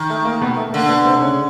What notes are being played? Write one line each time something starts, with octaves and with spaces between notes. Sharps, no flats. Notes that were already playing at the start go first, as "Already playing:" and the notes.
Already playing: D#3
A3
A#3
B2 B3
A3
D3 A#3
B2 B3
C3 C4
C#3 C#4